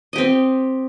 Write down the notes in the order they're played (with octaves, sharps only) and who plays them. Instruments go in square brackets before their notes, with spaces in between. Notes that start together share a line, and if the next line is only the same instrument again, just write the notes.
[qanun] D#5
G4
C4